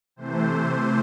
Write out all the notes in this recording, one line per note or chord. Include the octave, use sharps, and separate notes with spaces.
C3 E3 A3 C5